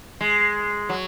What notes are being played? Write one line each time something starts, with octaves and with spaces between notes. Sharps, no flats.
G#3
F#3